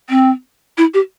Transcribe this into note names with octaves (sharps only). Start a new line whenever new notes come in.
C4
E4
G4